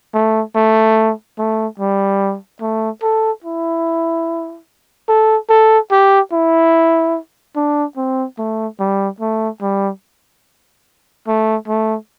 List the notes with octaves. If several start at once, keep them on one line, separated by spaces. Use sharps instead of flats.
A3
A3
A3
G3
A3
A4
E4
A4
A4
G4
E4
D4
C4
A3
G3
A3
G3
A3
A3